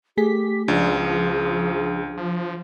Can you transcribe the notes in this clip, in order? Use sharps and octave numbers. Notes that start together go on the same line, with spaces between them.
A3 G4 G#4 B6
C#2 F3 D4 G#4
F3